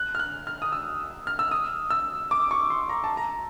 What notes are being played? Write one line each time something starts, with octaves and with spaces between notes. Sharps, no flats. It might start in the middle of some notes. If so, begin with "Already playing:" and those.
Already playing: F#6
F6
F#6
F6
D#6
E6
F6
E6
D#6
E6
D6
C#6
C6
A#5
A5
A#5